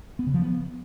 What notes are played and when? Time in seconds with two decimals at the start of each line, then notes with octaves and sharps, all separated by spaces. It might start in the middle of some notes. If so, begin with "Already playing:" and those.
0.19 B3
0.27 C#3
0.34 F3
0.42 B3